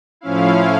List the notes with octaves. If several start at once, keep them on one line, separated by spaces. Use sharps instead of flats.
A2 F3 C#4 E4 F5